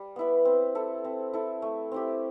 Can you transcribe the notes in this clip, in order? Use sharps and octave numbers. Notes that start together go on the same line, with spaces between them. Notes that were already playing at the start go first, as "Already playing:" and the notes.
Already playing: G3
B3 E4 B4
C4
E4 A4
C4
E4 A4
A3
C4 E4 G4